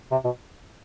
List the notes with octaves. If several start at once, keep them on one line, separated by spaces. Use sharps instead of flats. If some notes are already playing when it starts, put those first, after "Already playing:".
C3
B2